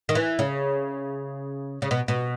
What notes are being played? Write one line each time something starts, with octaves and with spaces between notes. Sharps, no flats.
D#3
E3
C#3
C#3
B2
B2